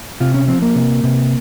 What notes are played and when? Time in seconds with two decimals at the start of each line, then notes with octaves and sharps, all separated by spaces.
0.20 C3 F4
0.34 C#4
0.48 F3 C4
0.62 A#3
0.75 C3
1.03 C3